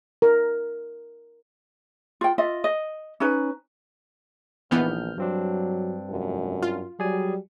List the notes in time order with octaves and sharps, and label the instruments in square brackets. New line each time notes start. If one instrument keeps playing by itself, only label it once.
[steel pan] A#4
[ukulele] F4 G5
F4 D#5 E5
D#5
C#4 D#4 B4
[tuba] A#1 [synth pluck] D#3 E3 B3 [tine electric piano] F6 G6
[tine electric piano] G2 C4 D4 [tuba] F#3
[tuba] F1 [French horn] F#2
[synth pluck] F4
[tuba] F#3 [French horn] G3 [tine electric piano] G#4 D5 G#5